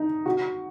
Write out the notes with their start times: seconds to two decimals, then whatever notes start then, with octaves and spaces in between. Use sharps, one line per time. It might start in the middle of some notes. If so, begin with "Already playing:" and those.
Already playing: D#4
0.26 F#4